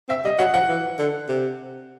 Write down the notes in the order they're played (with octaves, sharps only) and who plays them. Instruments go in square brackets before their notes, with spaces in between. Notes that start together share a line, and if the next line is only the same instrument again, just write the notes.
[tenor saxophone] C4 [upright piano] E5
[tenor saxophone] G3 [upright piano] D#5
[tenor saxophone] F#3 [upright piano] F#5
[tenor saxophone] F3 [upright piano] F#5
[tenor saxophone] E3
D3
C3